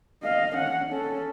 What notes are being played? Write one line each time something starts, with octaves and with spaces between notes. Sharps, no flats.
D#5 F5
C#4 F#5
C#4 A4